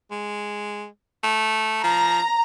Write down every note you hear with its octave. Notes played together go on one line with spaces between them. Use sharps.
G#3
A3
F3 A#5